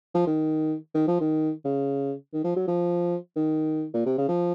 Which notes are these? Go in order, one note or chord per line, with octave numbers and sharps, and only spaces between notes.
F3
D#3
D#3
F3
D#3
C#3
D#3
F3
F#3
F3
D#3
A#2
C3
C#3
F3